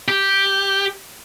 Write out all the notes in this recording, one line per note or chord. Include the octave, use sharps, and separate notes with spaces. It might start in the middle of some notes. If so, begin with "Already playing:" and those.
G4